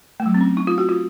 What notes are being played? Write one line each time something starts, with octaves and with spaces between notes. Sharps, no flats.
A3
F#3
C4
C#4
D#4
F4
F#4
F4